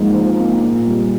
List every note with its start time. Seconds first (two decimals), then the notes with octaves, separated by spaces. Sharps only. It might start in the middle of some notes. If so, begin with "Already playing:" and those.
Already playing: G#2 F3 A#3 D#4
0.14 F3
0.39 A#3
0.63 A#2
0.87 G3